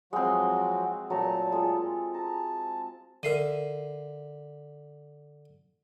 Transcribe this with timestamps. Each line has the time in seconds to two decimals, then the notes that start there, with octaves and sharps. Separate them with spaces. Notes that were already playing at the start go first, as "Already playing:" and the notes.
0.13 F3 F#3 G#3 C4 F#4
1.10 A#2 F#3 A3 A5 A#5
1.52 G#3 F4 A4
2.14 A5 A#5
3.23 D3 A#4 E5 C7 D#7